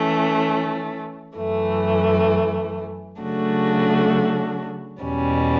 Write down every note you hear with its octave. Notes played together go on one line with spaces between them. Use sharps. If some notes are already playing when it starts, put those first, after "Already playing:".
Already playing: E3 A3 C#4
F#2 E3 A3
C#3 F#3 A3 D4 F#4
E2 B2 G3 C#4